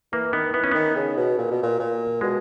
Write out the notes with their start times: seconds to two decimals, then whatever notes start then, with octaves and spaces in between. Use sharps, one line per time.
0.13 E3 A#3
0.33 D#3 B3
0.54 E3 B3
0.64 C#4
0.72 D#3 B3
0.96 C#3
1.17 B2
1.38 A#2
1.51 B2
1.63 A#2
1.79 A#2
2.21 B2 G#3